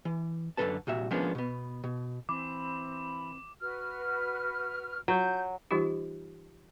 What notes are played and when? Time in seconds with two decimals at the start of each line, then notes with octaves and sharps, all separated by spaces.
0.05 E3
0.57 F#2 D3 F3 A4 B4 A5
0.87 C2 A#2 F#4 E5
1.11 F3 G#3 A#3 B3 C#4 D4
1.35 B2 B3
1.84 B2
2.29 E3 C4 B5 D6
3.61 F#4 B4 F6
5.08 F#3 G6
5.71 E3 G3 D#4 F4 G4